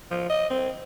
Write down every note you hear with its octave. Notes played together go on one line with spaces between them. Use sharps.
F3
D#5
C4